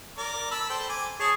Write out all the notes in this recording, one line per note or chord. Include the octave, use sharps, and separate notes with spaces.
A#4 D5 D6
A5 B5 E6
A4 C5 G5
G#5 D6
G#4 C#5 A5